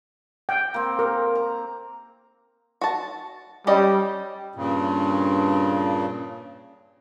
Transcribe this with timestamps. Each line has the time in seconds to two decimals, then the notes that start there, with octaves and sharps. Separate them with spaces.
0.49 G5
0.74 A#3 C4
0.99 A#4
1.35 A#5
2.81 F#4 A5
3.67 G3 C#4 D5 D#5
4.55 G2 A#2 C#3